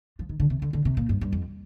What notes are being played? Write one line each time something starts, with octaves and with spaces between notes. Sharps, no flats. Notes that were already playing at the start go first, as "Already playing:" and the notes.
F3
D#3
D3
C3
D3
D3
C3
A#2
G2
G2
F2